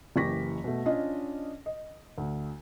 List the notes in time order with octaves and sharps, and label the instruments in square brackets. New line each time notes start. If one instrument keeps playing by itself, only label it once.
[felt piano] F#1 E3 G4 C#6 A#6 B6
B2 A3
C#4 D4 F4 D#5
D#5
D2